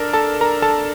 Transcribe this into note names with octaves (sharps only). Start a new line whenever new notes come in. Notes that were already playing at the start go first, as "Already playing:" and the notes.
Already playing: D4 A4 A#4
A4 A5
A#4 A#5
A4 A5